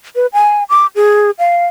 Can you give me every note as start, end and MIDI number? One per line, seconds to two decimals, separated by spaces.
0.16 0.27 71
0.33 0.64 80
0.69 0.86 86
0.96 1.31 68
1.39 1.66 77